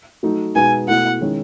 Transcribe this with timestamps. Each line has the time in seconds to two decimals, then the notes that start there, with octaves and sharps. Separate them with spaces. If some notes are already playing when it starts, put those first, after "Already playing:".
0.23 F#3 A3 D#4
0.55 B2 G#3 B3 D#4 G#5
0.88 B2 A3 E4 F#5
1.21 D#3 G#3 C#4 E4